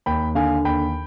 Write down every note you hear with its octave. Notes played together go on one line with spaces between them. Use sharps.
D#2 G5 B5
D3 F5 G#5
D#2 G5 B5